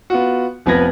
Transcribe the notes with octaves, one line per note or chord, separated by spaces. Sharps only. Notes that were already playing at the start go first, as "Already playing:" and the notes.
B3 F4 F#4
F1 F3 B3 B4 G#6 A#6